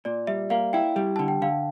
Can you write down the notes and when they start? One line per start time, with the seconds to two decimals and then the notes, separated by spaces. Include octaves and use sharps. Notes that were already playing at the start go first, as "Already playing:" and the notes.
0.05 A#2 D5
0.27 G3 E5
0.50 A#3 F5
0.73 E4 G5
0.96 G3
1.16 D3 A5
1.28 G5
1.42 D3 F5